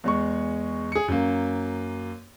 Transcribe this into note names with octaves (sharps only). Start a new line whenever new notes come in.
E2 G#3 C#6
G#4 C#7
F#2 A#3